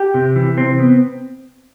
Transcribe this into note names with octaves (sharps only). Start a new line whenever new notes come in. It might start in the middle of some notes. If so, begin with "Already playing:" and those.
Already playing: G4
C3
E3
C3 C4
B3